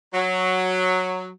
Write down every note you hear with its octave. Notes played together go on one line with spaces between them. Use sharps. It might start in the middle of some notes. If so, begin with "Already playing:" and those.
F#3